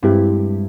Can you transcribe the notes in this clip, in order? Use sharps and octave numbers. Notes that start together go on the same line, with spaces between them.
G2 G#3 C4 E4 G4